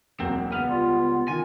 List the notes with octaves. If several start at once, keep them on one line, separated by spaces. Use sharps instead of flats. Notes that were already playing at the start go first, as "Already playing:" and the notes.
E1 F#3 A#3 C4
C#2 B3 F6
G3 F4
D3 D#3 F4 G#5